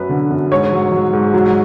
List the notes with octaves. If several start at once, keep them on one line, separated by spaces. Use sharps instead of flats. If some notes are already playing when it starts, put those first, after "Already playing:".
Already playing: F#2 F#3 B4
D3
F#2
G#2 C#5
F#3
F#3
G#2
F#3